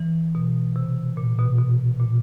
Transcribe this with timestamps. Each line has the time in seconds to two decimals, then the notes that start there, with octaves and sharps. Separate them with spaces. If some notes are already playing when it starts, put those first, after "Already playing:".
Already playing: E3
0.35 B2
0.76 C3
1.17 A#2
1.38 B2
1.58 B2
2.00 A#2